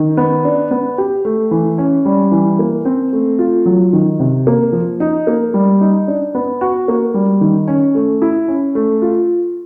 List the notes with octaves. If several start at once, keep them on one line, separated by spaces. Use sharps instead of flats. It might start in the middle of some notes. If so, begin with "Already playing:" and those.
Already playing: D#3
B3
D4
B3
G4
A3
E3
C#4
G3
E3
A#3
C4
A3
F4
F#3
D#3
C3
A#3
F3
D#4
A#3
G3
D#4
D4
B3
F#4
A#3
G3
D#3
C#4
A3
E4
C#4
A3
F4